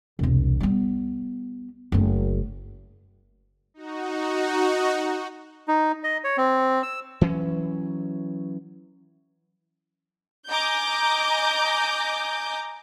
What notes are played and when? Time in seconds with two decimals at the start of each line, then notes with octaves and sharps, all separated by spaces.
0.19 E1 C2
0.60 G3 B3
1.92 F#1 A3
3.74 D#4 F#4
5.68 D#4
6.04 D#5
6.24 C#5
6.37 C4
6.83 E6
7.21 E3 F#3 C#4
10.49 D#5 G#5 A#5 D6 G6